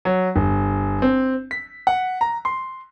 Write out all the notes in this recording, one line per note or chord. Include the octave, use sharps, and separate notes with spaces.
F#3
G1
C4
B6
F#5
A#5
C6